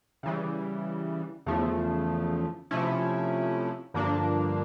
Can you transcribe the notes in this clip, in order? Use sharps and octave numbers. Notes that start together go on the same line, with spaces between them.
C#3 E3 G3
E2 C#3 F3 A3
C3 F3 A3 C#4 E4
G2 D3 F3 A#3 D4